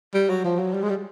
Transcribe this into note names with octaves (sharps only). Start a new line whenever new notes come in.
G3
F#3
F3
F#3
G3
G#3
G3